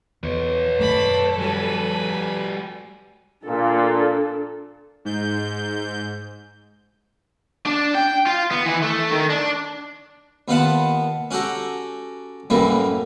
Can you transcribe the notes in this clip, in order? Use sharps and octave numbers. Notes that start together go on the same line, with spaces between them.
E2 B4 C#5
G#1 F#2 A3 A4 D5 B5
G3 F#4 B4 G#5
A#2 D4 A4
G#2 G6
D4
G5
F4
B3
E3
A3
D#3
D4
D#2 B3 F4 F#5 A5
C#4 F#4 G4 A4 A#5
F#2 A2 E3 G3 A#3